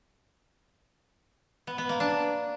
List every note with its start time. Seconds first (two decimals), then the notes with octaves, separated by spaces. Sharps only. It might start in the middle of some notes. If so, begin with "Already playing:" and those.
1.67 B3
1.78 B3
1.89 A#3
2.00 D4